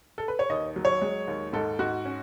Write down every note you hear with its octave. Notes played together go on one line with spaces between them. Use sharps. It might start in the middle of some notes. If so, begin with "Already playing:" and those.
A4
B4
C#5
D#2 D#5
F#3
C#5
G#3
D#2
G#2 A4
G#2 F#4
C#4